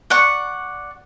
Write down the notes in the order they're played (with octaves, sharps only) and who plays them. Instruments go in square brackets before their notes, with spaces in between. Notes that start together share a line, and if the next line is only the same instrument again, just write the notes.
[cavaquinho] D5 F#5 C#6